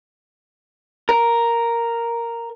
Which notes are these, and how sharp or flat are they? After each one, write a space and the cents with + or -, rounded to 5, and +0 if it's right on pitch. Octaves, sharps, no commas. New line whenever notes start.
A#4 +0